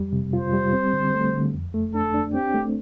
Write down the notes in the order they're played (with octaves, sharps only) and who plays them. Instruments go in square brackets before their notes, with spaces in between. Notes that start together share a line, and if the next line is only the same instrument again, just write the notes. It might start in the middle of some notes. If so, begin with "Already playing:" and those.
Already playing: [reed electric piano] F2 G3
C3
[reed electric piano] F4 [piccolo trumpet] C5
[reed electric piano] G3
C4
D3
A3
D3
F2
A3
[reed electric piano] D4 [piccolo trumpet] A4
[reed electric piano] D4
[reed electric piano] C4 [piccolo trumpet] G4
[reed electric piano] A3